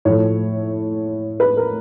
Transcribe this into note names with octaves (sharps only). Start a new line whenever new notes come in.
A2 F3 A3 C#5
B4
A#4